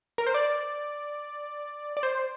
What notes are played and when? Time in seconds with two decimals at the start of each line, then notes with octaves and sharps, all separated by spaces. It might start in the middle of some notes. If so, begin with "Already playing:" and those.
0.18 A#4
0.27 C5
0.34 D5
1.97 D5
2.03 C5